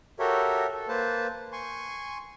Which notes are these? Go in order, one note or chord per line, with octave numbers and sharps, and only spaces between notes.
F#4 G4 A4 A#4 C#5 E5
A4
A#3 B4 C5 A5
G#5 C6 C#6